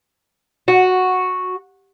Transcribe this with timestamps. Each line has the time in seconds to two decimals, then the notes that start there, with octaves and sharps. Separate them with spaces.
0.68 F#4